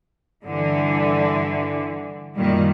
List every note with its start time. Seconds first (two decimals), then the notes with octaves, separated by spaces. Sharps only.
0.46 G2 D3 E3
2.37 F#2 A#2 D#3 G3